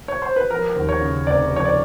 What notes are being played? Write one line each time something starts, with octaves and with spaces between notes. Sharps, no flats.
C#5
C5
B4
F3 A#4
D#2
C#5
C#3
F1 D5
F3 C#5
D5